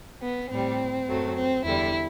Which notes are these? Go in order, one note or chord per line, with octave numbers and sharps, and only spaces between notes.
B3
A2 G3 C4
F#2 F#3 A3
C4
E2 D3 G3 E4